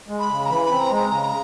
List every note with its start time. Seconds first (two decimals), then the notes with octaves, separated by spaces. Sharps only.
0.08 G#3
0.19 B5
0.30 C#3
0.46 A#5
0.49 E3 B5
0.65 B5
0.70 C4
0.80 A#5
0.90 G#3
0.96 A#5
1.11 C#3 A#5